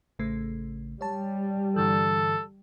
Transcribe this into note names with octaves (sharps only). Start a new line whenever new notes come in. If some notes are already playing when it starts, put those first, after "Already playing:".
A1 C#3 A3
G3 C#5 A5
G2 D3 E3 A4